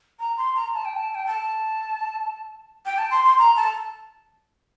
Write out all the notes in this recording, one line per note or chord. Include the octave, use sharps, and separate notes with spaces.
A#5
C6
A#5
A5
G5
A5
G5
A5
G5
A5
C6
C6
A#5
A5